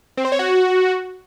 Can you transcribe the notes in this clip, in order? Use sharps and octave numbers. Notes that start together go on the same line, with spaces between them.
C4
C5
C#5
F#4